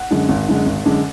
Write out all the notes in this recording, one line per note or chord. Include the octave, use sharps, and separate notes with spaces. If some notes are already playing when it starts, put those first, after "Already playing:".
Already playing: F#5
F#2 D3 G#3
G#1
F#2 D3 G#3
G#1
F#2 D3 G#3